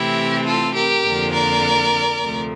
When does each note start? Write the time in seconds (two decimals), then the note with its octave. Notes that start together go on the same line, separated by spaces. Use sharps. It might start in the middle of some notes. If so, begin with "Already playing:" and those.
Already playing: C3 E3 A3 C4 E4 G4
0.46 F4 A4
0.75 G4 A#4
1.04 F2 D3 F3 A#3 D4
1.33 A#4 D5
2.20 D2 C3 F3 A3